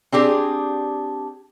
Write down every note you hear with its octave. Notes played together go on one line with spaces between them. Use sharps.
C4 D4 G4 G#4